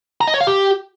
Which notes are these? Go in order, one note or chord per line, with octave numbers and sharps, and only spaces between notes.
A#5
D#5
C#5
F5
G4